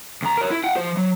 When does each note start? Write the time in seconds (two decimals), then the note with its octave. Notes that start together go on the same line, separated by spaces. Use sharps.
0.22 D2 A#5
0.38 A#4 C#5
0.51 E4
0.64 F#5 G5
0.77 F3 C5
0.97 F#3